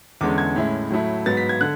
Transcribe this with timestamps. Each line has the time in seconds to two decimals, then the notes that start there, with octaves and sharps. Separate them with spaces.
0.21 E2 D3 G#3 C#4 D6
0.38 G#6
0.56 A2 G#3 C#4 E4
0.90 A2 F#3 A3 E4
1.26 G#2 F#3 B3 A6
1.37 B6
1.49 G#6
1.61 D3 F#6